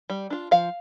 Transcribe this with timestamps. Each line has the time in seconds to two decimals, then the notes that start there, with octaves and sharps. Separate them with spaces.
0.10 G3
0.30 D4 F4
0.51 F3 F5